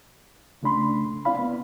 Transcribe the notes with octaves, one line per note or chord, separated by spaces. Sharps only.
C2 C#3 A3 D4 B5 C6
C4 E4 D5 F5 B5
B3